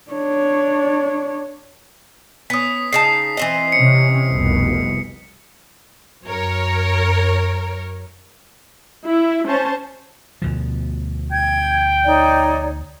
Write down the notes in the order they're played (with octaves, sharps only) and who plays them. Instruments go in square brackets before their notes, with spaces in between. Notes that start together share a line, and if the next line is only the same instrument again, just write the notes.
[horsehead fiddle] D4 C#5
[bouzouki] B3 C#4 [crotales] D#6 B6
[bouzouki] C#3 D#4 A5 [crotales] C7
[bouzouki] E3 C4 D#5
[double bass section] C3 C#4 [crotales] C#7
[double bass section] F1 C2 B2
[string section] F#2 A#4 C#5
[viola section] E4
C#4 C5 A5
[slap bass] D2 B2 F3
[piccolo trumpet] G5 [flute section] G#6
[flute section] D#4 C#5 D5